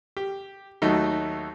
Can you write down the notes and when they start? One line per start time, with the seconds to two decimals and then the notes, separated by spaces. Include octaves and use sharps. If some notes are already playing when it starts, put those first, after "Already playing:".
0.17 G4
0.82 D#2 F#3 A3 D#4